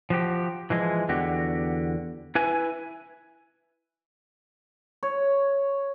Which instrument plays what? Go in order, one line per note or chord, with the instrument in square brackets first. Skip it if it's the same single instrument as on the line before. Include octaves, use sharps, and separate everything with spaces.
[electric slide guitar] F3 F#4 G4
E3 F3 G#3
E2 D3 F#4 G4
E4 B4 G#5
[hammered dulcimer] C#5